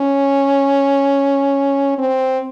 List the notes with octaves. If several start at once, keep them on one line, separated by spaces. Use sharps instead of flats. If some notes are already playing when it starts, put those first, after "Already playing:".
Already playing: C#4
C4